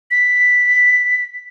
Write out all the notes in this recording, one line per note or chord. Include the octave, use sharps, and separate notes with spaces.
B6